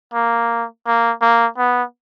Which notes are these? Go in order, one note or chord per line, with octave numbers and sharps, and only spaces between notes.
A#3
A#3
A#3
B3